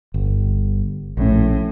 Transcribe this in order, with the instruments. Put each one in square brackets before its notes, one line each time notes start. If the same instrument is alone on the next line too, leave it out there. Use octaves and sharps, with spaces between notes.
[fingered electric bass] G1
[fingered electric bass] A#1 C#4 [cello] A2